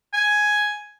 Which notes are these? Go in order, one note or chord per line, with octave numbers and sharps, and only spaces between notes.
G#5